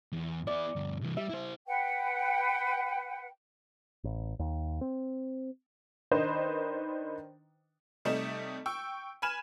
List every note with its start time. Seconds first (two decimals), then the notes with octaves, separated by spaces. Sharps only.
0.12 E2
0.47 B3 E4 D5
0.76 D2 G2
1.02 C2 E3
1.17 G3 E5
1.30 E4 C5
1.67 B4 F#5 G5
4.04 A1
4.39 D#2
4.81 C4
6.11 D#3 D4 D#4 B4 C5 D#5
8.05 C3 G3 A3 D#4 D#5 E7
8.66 G5 C#6 E6
9.22 G#5 B5 F6 G#6 D#7 E7